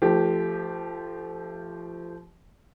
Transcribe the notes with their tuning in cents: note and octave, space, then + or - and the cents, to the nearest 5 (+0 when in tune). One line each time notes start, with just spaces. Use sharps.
F3 -25 A3 +0 G4 +0